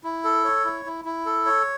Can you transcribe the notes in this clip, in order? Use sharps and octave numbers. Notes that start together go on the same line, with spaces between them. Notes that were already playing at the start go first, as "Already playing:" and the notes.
E4
A4
C#5
E4
E4
E4
A4
C#5